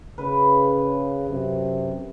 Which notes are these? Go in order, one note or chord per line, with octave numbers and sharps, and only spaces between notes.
C#3 B4
F#2 C3